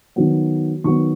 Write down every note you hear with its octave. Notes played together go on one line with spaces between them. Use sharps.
D#3 F#3 B3
D#3 F#3 B3 C#6